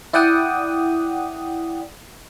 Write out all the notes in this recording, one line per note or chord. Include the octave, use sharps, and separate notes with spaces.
E4 D5 F#5 G5 D#6